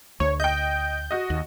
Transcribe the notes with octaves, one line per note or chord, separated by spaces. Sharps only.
D2 C#5
D#5 G5 G6
F#4 D#5
D#2